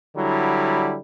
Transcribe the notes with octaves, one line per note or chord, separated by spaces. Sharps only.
D3 F#3 G3 E4